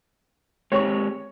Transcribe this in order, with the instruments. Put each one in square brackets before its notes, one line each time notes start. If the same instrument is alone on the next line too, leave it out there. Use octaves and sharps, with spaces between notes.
[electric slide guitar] G#3 C4 G4 [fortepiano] C#5 C#6